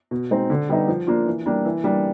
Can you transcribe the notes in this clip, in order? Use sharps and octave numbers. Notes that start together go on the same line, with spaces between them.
B2
G#3 C4 D#4
D3
G3 B3 D#4
F3
A#3 D4 F4
E3
G3 A#3 D4
E3
G3 A#3 D4